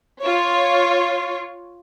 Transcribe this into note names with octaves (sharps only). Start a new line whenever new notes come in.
F4 C#5